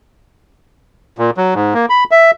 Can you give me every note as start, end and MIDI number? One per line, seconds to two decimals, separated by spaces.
1.18 1.31 46
1.37 1.54 54
1.54 1.74 44
1.74 1.86 58
1.89 2.04 83
2.11 2.31 76